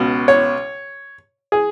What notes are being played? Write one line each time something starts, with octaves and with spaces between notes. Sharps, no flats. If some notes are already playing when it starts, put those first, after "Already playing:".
Already playing: C#2 B2
C#5
G#4